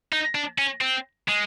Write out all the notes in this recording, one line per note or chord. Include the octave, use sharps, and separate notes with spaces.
D#4
D4
C#4
C4
G#3